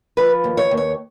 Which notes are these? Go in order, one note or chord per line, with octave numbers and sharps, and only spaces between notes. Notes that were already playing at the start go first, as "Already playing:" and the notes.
F3 B4
D#2
C#5
D#2
C#5